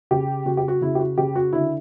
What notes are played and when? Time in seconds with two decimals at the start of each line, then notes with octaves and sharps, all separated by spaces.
0.11 C#3 G4
0.46 C#3 F#4
0.57 G4
0.68 F#4
0.81 C#3 E4
0.95 G4
1.00 F#4
1.18 C#3 G4
1.36 F#4
1.53 D3 E4